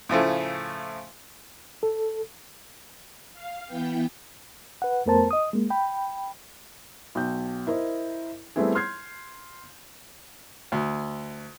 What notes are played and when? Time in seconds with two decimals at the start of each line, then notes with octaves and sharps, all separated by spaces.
0.09 A2 C#3 F3 A3
1.83 A4
3.33 F5
3.66 E3 B3 G5
4.82 B4 F#5
5.06 F2 A3 B3 A#4 C5 A5
5.31 D#5 D#6
5.53 G#3 A#3
5.70 G5 B5
7.15 B1 G5 G6
7.67 E4 A#4 C5 D#5
8.56 G3 A3 B3 C4 E4 G#4
8.75 C6 F6 G6 G#6 C7
10.72 D2